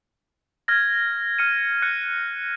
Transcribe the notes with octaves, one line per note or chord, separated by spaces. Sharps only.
F6 G#6 A#6
F6 C#7 D#7
F#6 C#7